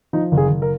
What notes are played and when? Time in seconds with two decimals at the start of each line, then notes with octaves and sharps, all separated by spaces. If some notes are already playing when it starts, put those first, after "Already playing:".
0.13 F3 D#4
0.32 F#1
0.38 G#4
0.50 F#1
0.62 A#4